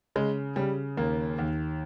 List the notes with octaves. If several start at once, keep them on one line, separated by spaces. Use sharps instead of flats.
C#3 G#3
C#3 G3
D#2 A#3
D#2